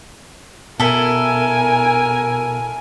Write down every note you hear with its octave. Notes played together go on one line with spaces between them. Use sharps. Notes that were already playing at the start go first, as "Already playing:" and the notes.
B2 E4 A4 A#4 G#5